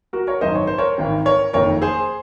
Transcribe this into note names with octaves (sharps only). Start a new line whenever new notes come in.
F#4 A#4
A#4 C#5
G#1 F#2 D#3 C5 D#5
C#5
C5
A#4 C#5
G#1 G#2 D#3
A#4 C#5
F#1 F2 D#3 A#4 C#5
G#4 C5